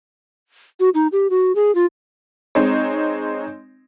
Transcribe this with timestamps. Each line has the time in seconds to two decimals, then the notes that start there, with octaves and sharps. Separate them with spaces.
0.80 F#4
0.94 D#4
1.12 G4
1.30 F#4
1.55 G#4
1.75 F4
2.55 G#3 C4 D#4 C#5